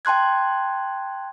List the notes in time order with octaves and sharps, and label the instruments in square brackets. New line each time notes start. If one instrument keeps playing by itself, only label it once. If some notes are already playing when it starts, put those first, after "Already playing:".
[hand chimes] G5 A5 C6 F#6 G#6